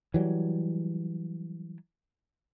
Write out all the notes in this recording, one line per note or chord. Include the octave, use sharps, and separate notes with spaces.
E3 F#3 G3